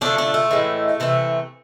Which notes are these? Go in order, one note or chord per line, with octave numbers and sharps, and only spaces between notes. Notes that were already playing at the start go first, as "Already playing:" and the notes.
D3 F3 A3 D4
D4
A3
A2 E3 G#3
C3 E3 A3